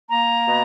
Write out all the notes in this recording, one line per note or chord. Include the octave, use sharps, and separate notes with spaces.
A#3 A#5
B2